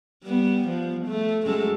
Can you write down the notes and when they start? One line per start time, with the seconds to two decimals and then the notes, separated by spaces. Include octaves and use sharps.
0.23 G3 B3
0.67 F3
1.06 A3
1.46 F#2 G#3 A4